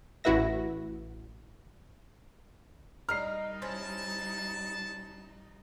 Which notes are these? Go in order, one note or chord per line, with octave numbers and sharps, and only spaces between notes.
A1 E4 F#4 B4 E5 A#6
G3 D#4 A#4 D#5 F6 C7
C#4 E4 C5 A5